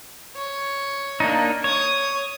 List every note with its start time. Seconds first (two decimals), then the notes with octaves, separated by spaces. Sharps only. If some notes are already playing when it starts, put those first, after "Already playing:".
0.36 C#5
1.20 A#3 D4 D#4
1.64 C#5 C#6 D#6